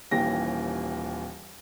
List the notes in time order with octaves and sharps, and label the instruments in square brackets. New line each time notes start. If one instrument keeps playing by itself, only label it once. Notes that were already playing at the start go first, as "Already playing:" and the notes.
[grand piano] D#1 D#2 E3 G5 A#6